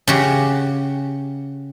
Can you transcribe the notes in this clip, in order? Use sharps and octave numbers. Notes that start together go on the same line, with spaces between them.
C#3 F#4 G4